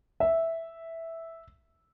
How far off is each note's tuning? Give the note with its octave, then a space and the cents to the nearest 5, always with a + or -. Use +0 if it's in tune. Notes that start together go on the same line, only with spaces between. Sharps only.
E5 -5